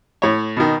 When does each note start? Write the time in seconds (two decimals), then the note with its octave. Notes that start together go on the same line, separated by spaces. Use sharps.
0.22 A2 C#5
0.57 B2 D#3